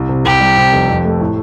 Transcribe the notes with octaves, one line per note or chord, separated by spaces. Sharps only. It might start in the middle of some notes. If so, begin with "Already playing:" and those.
Already playing: C2
C3
C2 G4
G3
C3
F1
F2
A3
A2